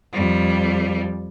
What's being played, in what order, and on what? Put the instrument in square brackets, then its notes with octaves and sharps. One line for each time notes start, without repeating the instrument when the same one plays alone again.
[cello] F2 G3